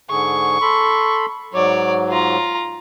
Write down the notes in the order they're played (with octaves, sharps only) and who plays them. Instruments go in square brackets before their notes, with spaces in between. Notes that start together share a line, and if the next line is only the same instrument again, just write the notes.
[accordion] G#2 D3 G#4 [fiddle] C#6
[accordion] A4 B5 C6
[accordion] G#2 F#3 [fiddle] C#5 D5
[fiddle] F4 A#5